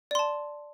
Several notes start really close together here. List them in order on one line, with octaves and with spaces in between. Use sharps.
D5 C6 A5